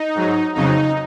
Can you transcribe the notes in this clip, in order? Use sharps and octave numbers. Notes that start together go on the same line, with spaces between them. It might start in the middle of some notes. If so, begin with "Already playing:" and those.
Already playing: D#4
G#2 F#3
F2 C#3 F#3 D#4